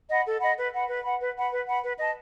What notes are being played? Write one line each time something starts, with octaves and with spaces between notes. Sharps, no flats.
D#5 F#5 B5
A4
D#5 F#5 B5
B4
F#5 B5
B4
F#5 B5
B4
F#5 B5
B4
F#5 B5
B4
D#5 A5